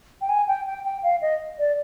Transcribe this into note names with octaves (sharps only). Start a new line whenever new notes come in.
G5
G#5
G5
G5
G5
F5
D#5
D5